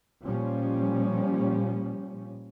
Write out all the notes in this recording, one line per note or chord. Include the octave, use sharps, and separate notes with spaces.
A#2 F3 G3 C#4